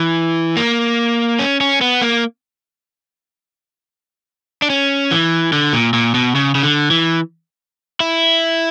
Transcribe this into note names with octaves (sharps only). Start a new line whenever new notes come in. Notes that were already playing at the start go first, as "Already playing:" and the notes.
Already playing: E3
A#3
C#4
C#4
B3
A#3
D4
C#4
E3
D3
A#2
A#2
B2
C#3
C#3
D3
E3
E4